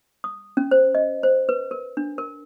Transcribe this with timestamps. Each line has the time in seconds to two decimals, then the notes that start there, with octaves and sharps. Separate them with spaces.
0.24 D#6
0.57 C#4
0.71 C5
0.95 D#5
1.23 C5
1.49 B4
1.71 A#4
1.97 D4
2.18 A#4